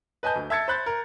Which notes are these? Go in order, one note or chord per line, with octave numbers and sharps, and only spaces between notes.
B4 D#5 G#5 A5 G6
D2
E5 A5 E6 G#6 A6 C#7
C5 B5 F#6 G6 A6
A#4